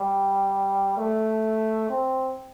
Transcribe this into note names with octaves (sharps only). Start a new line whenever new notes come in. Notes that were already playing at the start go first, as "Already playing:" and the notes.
Already playing: G3
A3
C4